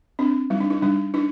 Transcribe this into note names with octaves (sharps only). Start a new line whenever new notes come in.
C4 D4
G3 D#4
D4
D#4
G3 D4
D4 D#4